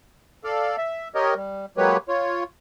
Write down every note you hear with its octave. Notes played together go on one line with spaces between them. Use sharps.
A4 D5 F5
E5
G4 A#4 C#5 D#5
G3
F#3 G#3 A#3 G4 B4 C#5
F4 C#5